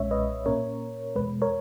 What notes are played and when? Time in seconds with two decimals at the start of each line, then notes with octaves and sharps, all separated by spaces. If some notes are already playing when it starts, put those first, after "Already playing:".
Already playing: B1 A#2 G#3 C#4 C#5 E5
0.11 B4 D#5
0.46 A#2 A#3 C#4 A#4 C#5
1.16 E2 B2 G#3 B4
1.42 A#4 C#5